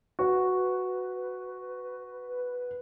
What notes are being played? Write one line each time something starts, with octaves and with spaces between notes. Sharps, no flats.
F#4 B4